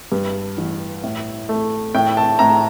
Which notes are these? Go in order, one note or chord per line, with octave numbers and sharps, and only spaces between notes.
G2
A1
A2
A3
A2 G5
A5
A2 A#5